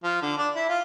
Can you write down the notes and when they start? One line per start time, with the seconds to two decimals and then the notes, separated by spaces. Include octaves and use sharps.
0.04 F3
0.22 D3
0.38 D4
0.55 E4
0.69 F4